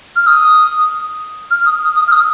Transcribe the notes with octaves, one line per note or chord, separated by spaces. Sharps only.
F6
D#6
F6
D#6
D#6
F6
D#6